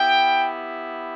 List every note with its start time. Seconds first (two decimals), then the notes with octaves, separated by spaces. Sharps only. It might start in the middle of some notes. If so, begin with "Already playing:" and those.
Already playing: B3 E4 G4 G5